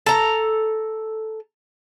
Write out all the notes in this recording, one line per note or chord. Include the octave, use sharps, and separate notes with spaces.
A4 A#5